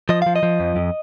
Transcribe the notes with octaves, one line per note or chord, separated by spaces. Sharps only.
F3 D#5
F3 F5
D#5
F3
F2
F2